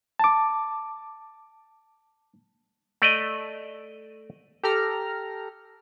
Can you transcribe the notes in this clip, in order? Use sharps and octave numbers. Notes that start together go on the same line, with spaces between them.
A5 D6
A3 D5 D#5
G4 A4 A#5 F6